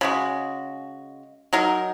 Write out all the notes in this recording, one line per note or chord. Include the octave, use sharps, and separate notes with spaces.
C#3 G#3 F#4
F#3 D#4 A#4